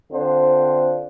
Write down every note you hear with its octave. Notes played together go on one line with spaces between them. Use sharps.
D3 C4 D4 F4 C5